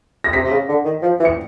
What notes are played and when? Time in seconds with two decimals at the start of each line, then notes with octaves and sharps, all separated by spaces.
0.24 A#6
0.33 C3 B6
0.44 C3
0.51 C#3
0.68 D3
0.84 D#3
1.02 F3
1.20 E3
1.25 C#7